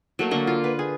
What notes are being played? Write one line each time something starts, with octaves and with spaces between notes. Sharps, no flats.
F#3 A3 A#3
D3 A#3
F4
B4
G#4